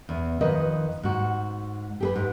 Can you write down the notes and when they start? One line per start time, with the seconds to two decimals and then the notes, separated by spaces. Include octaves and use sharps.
0.09 E2
0.41 F2 D#3 B4 D#5
1.03 G#2 F#4
2.00 G4 G#4 B4
2.16 G#2